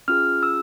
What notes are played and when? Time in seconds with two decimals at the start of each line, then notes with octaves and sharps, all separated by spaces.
0.08 C#4 F4 G#4 F6
0.43 E6